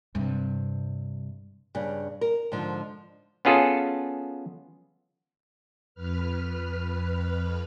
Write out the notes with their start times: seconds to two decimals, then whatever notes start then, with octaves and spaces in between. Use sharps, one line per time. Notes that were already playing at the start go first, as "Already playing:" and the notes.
0.15 G2 C3
1.75 G2 C#3
2.21 A#4
2.52 G#2 D3 F3
3.45 B3 C#4 F4 G#4 A4
5.95 F2 B4 F6